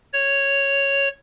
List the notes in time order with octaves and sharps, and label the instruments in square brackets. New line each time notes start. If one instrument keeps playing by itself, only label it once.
[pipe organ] C#5